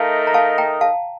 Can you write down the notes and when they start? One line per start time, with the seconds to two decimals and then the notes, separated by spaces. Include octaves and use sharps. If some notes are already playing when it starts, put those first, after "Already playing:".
Already playing: A3 D#4 A#4 D#5 F5 A5
0.27 A#5
0.34 F5 A5
0.58 G5 A#5
0.81 F5 A5